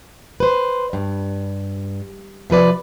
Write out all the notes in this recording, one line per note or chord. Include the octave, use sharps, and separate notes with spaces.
B4 C5
G2
C3 F3 B4 D5